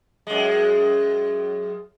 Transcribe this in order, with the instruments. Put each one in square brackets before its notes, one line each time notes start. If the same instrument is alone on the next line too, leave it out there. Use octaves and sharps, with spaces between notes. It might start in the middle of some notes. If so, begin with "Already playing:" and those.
[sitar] F#2 G#3